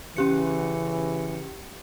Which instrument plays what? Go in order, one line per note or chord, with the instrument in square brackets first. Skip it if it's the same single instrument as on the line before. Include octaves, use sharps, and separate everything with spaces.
[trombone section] C#3 E3 [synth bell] C#4 G4 C#7